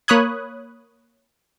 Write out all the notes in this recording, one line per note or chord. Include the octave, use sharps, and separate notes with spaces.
A#3 C#5 B5 D#6 F#6 G#6